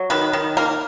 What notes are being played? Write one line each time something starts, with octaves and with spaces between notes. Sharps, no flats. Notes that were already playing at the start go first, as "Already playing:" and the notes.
Already playing: F#3
D#3 B4
D#3
A#3 A#4